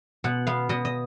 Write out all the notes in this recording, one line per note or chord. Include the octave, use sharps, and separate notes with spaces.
B2 F#5
B3 F5
B2 D#5
D#5